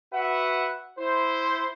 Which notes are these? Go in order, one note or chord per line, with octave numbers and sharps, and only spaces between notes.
F#4 B4 E5 F#5
E4 C5